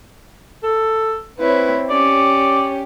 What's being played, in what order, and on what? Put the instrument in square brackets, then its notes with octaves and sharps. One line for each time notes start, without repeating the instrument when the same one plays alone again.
[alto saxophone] A4
[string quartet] C4 E4 C#5 [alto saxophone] B4
[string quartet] C#4 G4 [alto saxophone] D5